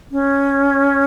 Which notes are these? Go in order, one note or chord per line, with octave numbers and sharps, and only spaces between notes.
C#4